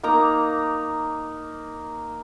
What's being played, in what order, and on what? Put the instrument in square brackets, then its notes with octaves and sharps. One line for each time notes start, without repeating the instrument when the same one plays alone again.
[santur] A#3 D#4 A#5 D6